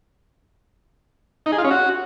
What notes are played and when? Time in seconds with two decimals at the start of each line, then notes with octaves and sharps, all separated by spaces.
1.46 D#4
1.52 G#4
1.58 F4
1.64 C#4
1.71 F#4